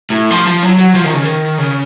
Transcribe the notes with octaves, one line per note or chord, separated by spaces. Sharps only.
A2
F3
F3
F#3
F#3
F3
D#3
C#3
D#3
C#3